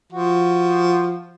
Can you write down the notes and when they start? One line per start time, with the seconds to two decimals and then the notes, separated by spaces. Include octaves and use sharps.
0.13 F3 F#4